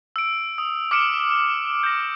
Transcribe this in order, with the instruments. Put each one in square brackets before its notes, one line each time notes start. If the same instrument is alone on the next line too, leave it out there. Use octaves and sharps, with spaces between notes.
[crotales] E6 D7
D#6
D6 E6 F6 C#7 D7 E7
G6 A#6